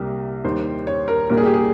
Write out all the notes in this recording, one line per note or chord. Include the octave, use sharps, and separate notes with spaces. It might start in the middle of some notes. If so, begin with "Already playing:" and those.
Already playing: C2 C3 G3 A#3
D#2 D#3 G3 C5
C#5
A#4
C2 A#2 G3 A#3 A#4
G#4
G4
G#4